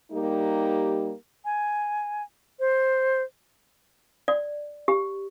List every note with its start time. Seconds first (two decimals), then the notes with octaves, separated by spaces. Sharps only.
0.12 G3 A#3 D#4 G4
1.45 G#5
2.60 C5
4.28 D5
4.88 G4